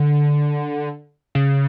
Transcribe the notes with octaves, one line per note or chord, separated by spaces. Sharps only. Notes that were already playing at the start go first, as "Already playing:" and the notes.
Already playing: D3
C#3